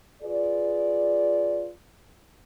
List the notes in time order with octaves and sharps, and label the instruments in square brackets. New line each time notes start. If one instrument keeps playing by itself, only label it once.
[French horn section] F4 G#4 B4 D5